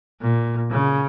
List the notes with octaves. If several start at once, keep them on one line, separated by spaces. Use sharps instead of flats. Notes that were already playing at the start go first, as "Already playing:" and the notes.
A#2
C#3